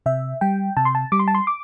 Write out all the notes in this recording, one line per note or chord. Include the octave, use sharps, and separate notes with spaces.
C3 E5
G3 G5
C3 A5
C6
A5
G3 D6
C6
A5
C6
D6